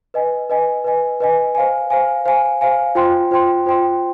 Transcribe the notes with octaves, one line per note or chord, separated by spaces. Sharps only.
B4 D#5 G#5
B4 D#5 G#5
B4 D#5 G#5
B4 D#5 G#5
C5 F5 G#5
C5 F5 G#5
C5 F5 G#5
C5 F5 G#5
F4 C5 G5 C6
F4 C5 G5 C6
F4 C5 G5 C6